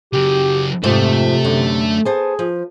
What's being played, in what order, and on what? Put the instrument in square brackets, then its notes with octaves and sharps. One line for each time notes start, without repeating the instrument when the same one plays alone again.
[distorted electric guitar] C#3 F#3 [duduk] G4
[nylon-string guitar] F2 G#2 F3 [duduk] C3 [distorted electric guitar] A3 A4
[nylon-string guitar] F#2 D3
[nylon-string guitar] B3 C5 A5 [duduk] G#4
[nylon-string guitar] F3